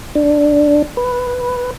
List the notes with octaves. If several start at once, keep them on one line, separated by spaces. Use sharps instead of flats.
D4
B4